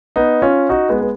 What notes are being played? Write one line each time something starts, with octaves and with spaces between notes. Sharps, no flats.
B3 D#4
C#4 F4
D#4 F#4
G#3 B3
B3